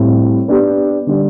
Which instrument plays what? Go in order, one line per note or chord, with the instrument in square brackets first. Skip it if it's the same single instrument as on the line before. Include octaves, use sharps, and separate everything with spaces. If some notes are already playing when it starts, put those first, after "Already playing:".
Already playing: [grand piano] A2 G3 C4
B3 D4 G4
D3 G3 D4